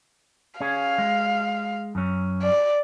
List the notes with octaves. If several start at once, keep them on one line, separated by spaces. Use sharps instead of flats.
C#4 G#4 F5
G#3
F#2 C#4
D5